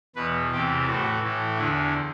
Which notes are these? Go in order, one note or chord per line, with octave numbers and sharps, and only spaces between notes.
E2 B2 B4
E2 C3 E3 G4
A2 E3 F#4
A2 E3
E2 D3 E4